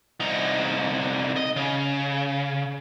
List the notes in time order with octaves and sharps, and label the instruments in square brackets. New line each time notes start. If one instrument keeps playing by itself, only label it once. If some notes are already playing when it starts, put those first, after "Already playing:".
[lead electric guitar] C2 D#4
D#5
C#3